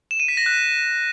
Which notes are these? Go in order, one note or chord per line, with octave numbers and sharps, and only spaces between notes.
E7
D#7
B6
A#6
F#6